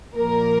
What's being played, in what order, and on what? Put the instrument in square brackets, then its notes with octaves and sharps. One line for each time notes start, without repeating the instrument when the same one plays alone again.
[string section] A#2 F3 A#3 A#4